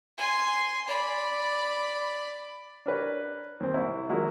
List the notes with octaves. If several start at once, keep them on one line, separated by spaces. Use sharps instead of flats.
G#5 C6
D5 B5
D4 A#4 B4 C#5
D#2 C4
C2 E4
D#3 F3 F#3 G#3 A#3 E4